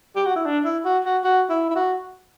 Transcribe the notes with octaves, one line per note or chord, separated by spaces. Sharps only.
G4
F#4
E4
D4
E4
F#4
F#4
F#4
E4
E4
F#4